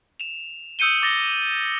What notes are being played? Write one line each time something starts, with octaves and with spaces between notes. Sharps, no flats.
E7 F7
D#6 E6 G6 C#7 D#7 G7
D6 A6 A#6 G7